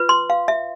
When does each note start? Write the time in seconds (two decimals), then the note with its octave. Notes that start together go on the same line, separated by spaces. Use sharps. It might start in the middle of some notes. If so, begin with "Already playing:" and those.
Already playing: F4 B4
0.09 C6
0.30 F5
0.48 E5